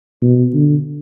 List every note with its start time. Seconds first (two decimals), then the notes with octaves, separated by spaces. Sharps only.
0.22 B2
0.54 D3